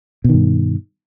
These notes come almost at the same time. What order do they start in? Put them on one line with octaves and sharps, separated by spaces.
B2 D#3 G2